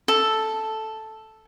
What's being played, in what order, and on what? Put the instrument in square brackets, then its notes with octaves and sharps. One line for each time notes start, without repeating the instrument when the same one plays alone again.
[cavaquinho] A4